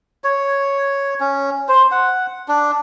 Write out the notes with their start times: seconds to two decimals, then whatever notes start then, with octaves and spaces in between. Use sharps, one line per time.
0.24 C#5
1.20 C#4
1.68 C5
1.92 F#5
2.48 D4